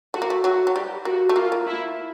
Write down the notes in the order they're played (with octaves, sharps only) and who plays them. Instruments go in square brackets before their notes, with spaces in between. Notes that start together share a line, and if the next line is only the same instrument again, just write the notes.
[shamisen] A3 [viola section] F#4
[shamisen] A#3
A3
[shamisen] F#3 [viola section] F#4
[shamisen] F#3
[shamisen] G3 [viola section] G4
[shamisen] A#3 [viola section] F#4
[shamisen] A3
[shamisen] A#3 [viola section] F4
[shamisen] A#3
[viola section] E4